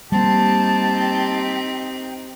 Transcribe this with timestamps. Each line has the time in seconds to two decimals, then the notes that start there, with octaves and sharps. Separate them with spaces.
0.12 G3 A#3 C4 D#4 G4 A5